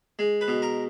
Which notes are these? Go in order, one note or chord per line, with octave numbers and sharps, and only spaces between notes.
G#3
B4
B2
A#4